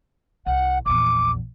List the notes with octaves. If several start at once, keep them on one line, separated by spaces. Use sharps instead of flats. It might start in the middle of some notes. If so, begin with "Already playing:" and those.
C2 F#5
A#1 E2 D6